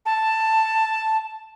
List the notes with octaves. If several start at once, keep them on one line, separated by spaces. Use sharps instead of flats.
A5